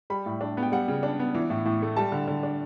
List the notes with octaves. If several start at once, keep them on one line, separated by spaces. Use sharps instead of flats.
G3 B5
A2
D4
B3
G5
G3 F#5
C#3
D4
B3
E3
A2
A2
A3
G3 A5
D3
D3
D4